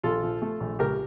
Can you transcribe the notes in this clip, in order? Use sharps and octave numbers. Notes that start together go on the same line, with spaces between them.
A#1 F4 A4
F3
A3
A#1
C#2 G4 A#4